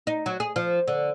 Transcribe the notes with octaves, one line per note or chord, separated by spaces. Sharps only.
D#4
F#3
G#4
F3
D3